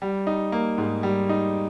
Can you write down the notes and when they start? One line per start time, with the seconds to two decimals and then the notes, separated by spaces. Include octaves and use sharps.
0.02 G3
0.27 D#4
0.52 A#3
0.78 G#2
1.03 G3
1.29 D#4